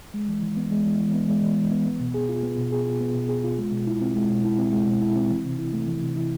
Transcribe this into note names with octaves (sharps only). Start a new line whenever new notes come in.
G#3
E3
E3
B3
G#3
E3
E3
B3
G#3
E3
E3
B3
B3
B2
G#4
F4
B3
B2
G#4
F4
B3
B2
G#4
F4
G#3
B2
E4
C4
G#3
B2
E4
C4
G#3
B2
E4
C4
E3
C3
E4
A3
E3
C3
E4